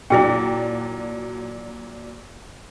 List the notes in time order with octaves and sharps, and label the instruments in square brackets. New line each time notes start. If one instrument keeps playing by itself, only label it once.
[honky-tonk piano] A#2 F#3 D4 [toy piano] E4 G#4 G5